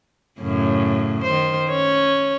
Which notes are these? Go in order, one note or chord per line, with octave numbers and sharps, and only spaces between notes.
F#2 A2 C#3
D#3 C5
C#4 C#5